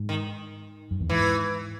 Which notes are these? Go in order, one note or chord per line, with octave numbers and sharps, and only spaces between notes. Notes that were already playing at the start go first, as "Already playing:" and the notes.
Already playing: G#2
D#3
F#2
E2
G#2 E3